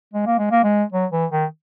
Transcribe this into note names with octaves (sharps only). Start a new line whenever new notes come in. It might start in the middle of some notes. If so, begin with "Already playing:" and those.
G#3
A#3
G#3
A#3
G#3
F#3
E3
D#3